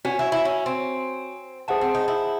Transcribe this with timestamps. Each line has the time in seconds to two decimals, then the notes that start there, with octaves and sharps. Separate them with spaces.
0.05 C#4 F#4 C#5 G#5
0.19 E4
0.32 E4
0.45 C#4
0.66 C4
1.68 A3 G#4 C5 F#5 A5
1.81 C4
1.95 D#4
2.08 E4